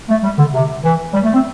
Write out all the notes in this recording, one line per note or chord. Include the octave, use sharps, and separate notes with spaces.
A3
G3
D3
C3
E3
G3
A3
C4